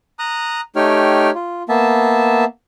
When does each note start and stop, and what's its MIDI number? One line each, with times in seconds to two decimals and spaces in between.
0.19 0.61 82
0.19 0.61 87
0.19 0.61 90
0.76 1.31 57
0.76 1.31 63
0.76 1.31 67
0.76 1.31 73
0.76 1.31 79
0.76 1.31 89
1.35 1.63 65
1.69 2.45 58
1.69 2.45 59
1.69 2.45 76
1.69 2.45 81